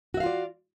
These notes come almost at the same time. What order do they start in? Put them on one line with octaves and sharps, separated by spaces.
F#4 E5 F5 F4 D5